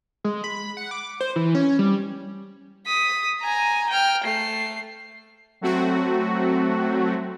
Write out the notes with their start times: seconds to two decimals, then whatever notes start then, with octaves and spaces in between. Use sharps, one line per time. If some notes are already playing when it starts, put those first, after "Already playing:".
0.24 G#3
0.44 B5
0.77 F#5
0.91 D6
1.20 C5
1.36 E3
1.55 C#4
1.79 G3
2.87 D#6 B6
3.41 G#5 A#5
3.90 G5 F6
4.24 A3 C7
5.61 F#3 A3 C4 F#4